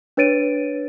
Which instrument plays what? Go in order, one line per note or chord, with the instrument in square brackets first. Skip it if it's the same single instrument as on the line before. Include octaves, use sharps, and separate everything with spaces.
[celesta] D4 B4 C#5 A6 D7 D#7